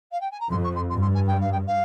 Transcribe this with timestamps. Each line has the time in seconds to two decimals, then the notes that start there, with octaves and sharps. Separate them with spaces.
0.11 F5
0.20 G5
0.31 G#5
0.40 A#5
0.49 F2 C6
0.63 C#6
0.75 C6
0.89 G2 C6
1.01 C6
1.14 G#5
1.27 G5
1.40 F5
1.52 G5
1.67 F5